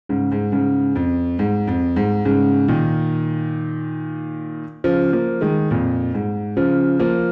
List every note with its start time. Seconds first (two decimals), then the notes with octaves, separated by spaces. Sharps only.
0.09 G#2 C#3
0.32 G#2
0.52 G#2 C#3
0.95 F2
1.39 G#2
1.67 F2
1.96 G#2
2.25 G#2 C#3
2.68 A#2 D#3
4.84 C#3 F3
5.13 F3 A#3
5.41 D#3 G#3
5.71 F2 A#2
6.14 G#2
6.57 C#3 F3
6.99 F3 A#3